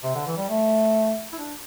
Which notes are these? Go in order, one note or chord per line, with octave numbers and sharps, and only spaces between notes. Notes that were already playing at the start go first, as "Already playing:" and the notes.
C3
D3
E3
G3
A3
E4
D4